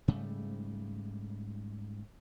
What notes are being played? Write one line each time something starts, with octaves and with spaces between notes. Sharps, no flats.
G#2 C#3 G3 A3